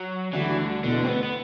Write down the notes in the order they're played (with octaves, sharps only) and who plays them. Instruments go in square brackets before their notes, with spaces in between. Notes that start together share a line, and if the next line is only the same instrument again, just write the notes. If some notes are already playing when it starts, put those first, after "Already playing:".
Already playing: [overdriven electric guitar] F#3
[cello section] D2 D3 G3 D4 F#4 [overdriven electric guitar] E3
[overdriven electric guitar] D3
[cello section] E2 B2 A3 [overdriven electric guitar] D3
[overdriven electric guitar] C4
B3
B3